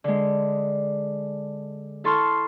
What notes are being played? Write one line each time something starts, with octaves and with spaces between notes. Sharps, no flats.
D3 G#3
E4 A4 A5 C6 C#6 F6